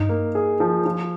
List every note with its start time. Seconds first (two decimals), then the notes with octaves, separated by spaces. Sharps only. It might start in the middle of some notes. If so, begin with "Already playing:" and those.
Already playing: G2 D#4
0.09 A#3
0.35 G#4
0.60 F3
0.86 F3